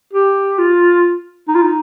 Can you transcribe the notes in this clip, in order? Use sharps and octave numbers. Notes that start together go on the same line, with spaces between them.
G4
F4
D#4
F4
D#4